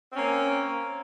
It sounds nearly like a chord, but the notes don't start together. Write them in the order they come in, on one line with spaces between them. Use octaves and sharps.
C4 C#4 A#3